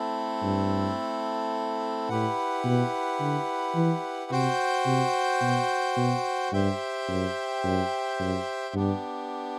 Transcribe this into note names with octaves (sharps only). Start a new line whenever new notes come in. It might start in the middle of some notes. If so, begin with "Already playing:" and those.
Already playing: A3 C4 E4 A4
G2
A2 E4 G4 B4 F#5
B2
D3
E3
C3 F#4 C5 G5
C3
B2
B2
G2 G4 C5 E5 G5
F#2
F#2
F#2
G2 B3 D4 G4